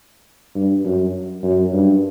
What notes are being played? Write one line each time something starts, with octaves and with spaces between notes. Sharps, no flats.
G2
F#2
F#2
G2